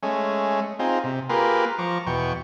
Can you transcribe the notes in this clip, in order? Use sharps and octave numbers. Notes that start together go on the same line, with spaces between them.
G#3 A3 C#4
C4 D#4 F4 G#4
C3
A#3 F4 G4 G#4 A#4 B4
F3 A#5 C#6 D6
E2 B2 G5 C#6